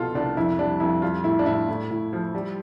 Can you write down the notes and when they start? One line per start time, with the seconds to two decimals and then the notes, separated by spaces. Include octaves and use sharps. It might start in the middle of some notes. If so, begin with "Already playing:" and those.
Already playing: C2 B2 F4 A4
0.15 C2 D4
0.37 F2 E4
0.59 G3 D4
0.80 F2 E4
1.02 G3 F4
1.24 A2 E4
1.39 D4
1.46 A2 E4
1.69 A2
1.91 A2
2.13 F3
2.35 G3